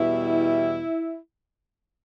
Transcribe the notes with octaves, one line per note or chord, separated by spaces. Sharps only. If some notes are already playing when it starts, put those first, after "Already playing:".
Already playing: E2 B2 G3 E4